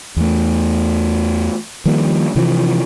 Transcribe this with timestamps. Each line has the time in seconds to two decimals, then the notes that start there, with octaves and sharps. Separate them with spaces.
0.17 E2 A3
1.86 D#3 F3 G3 A#3
2.36 C3 E3 F3